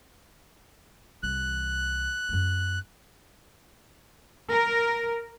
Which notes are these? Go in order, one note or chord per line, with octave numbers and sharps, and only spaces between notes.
C2 E3 F#6
F#2 G#3
A#4